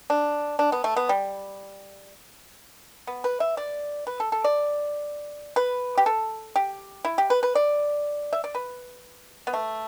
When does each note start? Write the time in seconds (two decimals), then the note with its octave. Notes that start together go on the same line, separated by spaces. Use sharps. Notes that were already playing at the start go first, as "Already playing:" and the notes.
0.10 D4
0.59 D4
0.72 B3
0.84 A3
0.96 B3
1.09 G3
3.07 B3
3.24 B4
3.40 E5
3.57 D5
4.07 B4
4.20 A4
4.32 A4
4.44 D5
5.56 B4
5.98 G4
6.06 A4
6.56 G4
7.05 E4
7.18 G4
7.30 B4
7.43 B4
7.55 D5
8.33 E5
8.44 D5
8.55 B4
9.47 B3
9.53 A3